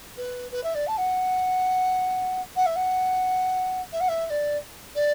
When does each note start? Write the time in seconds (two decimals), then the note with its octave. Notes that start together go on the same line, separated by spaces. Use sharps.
0.17 B4
0.51 B4
0.63 E5
0.74 D5
0.87 A5
0.97 F#5
2.56 F#5
2.66 E5
2.75 F#5
3.92 E5
4.00 F#5
4.08 E5
4.26 E5
4.29 D5
4.95 D5